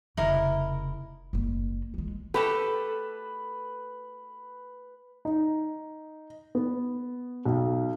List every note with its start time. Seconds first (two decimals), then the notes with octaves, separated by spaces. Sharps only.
0.17 F1 C#3 E4 A#4 D#5
1.33 F#1 A#3
1.94 E3 G#3
2.34 A3 G4 A4 B4
5.25 D#4
6.55 B3
7.45 B1